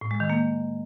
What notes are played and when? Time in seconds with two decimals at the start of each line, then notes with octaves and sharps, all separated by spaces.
0.01 A2
0.11 G#3
0.20 D#3
0.30 A#3